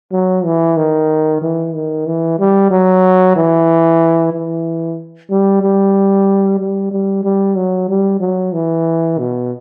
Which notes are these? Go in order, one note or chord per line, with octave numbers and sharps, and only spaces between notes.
F#3
E3
D#3
E3
D#3
E3
G3
F#3
E3
E3
G3
G3
G3
G3
G3
F#3
G3
F#3
E3
B2